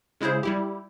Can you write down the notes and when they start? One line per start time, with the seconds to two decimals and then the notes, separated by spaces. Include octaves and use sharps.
0.21 C#3 G#3 E4 G#4 C5
0.43 G3 E4 G4